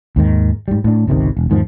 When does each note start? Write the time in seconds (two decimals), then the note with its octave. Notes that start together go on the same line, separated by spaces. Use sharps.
0.16 D#2 G#2 D#3
0.68 G#2 G3
0.84 A2 D4
1.07 G#1 C#2 C3 D#3
1.37 E1
1.50 E2 G#2 D#3 F3